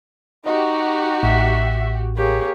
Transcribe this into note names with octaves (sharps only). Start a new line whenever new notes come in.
D#4 F#4 G4 D#5
A1 A2 E5
A#3 G4 G#4 C#5